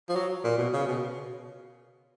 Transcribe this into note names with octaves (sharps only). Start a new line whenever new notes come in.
F3
F#3
A#2
B2
C#3
B2